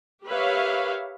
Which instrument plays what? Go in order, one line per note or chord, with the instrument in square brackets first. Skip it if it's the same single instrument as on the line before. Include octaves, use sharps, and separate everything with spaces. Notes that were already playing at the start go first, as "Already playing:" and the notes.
[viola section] G4 A#4 B4 C#5 E5 F5